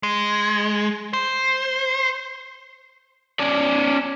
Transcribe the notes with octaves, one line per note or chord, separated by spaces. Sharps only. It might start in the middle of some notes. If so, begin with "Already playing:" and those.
G#3
C5
C#4 D5